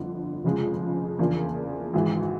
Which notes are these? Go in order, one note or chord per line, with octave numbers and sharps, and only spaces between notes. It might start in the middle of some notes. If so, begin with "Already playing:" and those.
Already playing: G1 F2 D3
F1 F2 C#3 F3 G#3
E2 C#3 F3 A#3 D4
G#1 G#2 E3